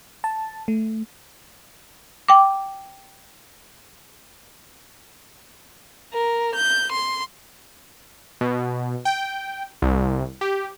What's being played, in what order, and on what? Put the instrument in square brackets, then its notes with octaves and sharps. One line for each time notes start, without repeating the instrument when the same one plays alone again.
[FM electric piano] A5
A3
[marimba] G5 D6
[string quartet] A#4
G6
C6
[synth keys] B2
G5
C2
G4